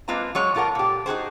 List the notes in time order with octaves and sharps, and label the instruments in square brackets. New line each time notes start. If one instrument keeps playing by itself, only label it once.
[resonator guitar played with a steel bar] G#3 A#3 C4 F4 B4 A#5
F#3 G#3 C#5
A#2 F4 A4 A#4 F#5
A#2 G4
D#4 F#4 G#4 C5